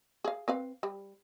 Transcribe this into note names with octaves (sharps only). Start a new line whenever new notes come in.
G#4 F5
C4 B4 F5
G3